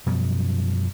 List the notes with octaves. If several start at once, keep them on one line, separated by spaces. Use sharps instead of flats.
F#2 B2 F3 G3